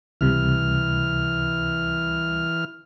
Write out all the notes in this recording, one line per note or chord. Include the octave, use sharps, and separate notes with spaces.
C#2 C3 E3 G3 F6